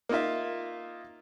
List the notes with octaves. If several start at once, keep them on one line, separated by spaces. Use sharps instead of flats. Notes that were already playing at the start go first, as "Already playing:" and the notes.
A#3 D#4 F4 E5